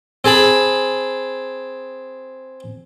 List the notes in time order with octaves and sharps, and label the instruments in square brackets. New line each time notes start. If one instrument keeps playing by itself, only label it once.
[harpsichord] C4 G#4 A5 B5